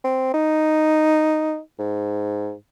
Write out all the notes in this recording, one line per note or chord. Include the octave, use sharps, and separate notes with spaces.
C4
D#4
G#2